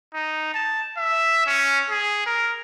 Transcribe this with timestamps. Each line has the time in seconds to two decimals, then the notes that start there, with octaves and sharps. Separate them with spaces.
0.15 D#4
0.54 A5
0.98 E5
1.47 C#4
1.90 G#4
2.27 A#4